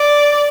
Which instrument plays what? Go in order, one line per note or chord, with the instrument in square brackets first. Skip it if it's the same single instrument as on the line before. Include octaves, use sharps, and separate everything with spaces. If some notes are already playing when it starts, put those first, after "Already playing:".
Already playing: [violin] D5